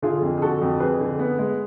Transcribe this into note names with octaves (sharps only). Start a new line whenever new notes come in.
D3 F4 G#4
F2
G#4
D3 F#4 A4
F2
F2 G#4 B4
D3
B3
G#3